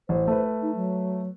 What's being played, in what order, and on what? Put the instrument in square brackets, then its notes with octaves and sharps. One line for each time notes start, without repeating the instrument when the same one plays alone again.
[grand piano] A1 [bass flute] C5
[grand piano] A3 B4
[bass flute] D#4
F#3